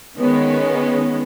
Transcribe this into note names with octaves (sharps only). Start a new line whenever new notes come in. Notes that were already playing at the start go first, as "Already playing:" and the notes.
D#3 G#3 B3 C#4